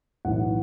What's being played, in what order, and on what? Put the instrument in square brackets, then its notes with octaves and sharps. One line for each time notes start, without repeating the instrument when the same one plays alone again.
[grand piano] B1 A2 E3 F#5